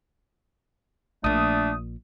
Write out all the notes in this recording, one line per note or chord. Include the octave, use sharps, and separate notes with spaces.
A#1 A#2 A3 D4 D#6